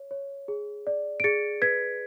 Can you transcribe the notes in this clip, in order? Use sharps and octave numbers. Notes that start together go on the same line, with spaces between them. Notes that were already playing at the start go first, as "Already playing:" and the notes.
Already playing: C#5
C#5
G#4
D5
D7
G#4 A6 C#7
B4 G#6 B6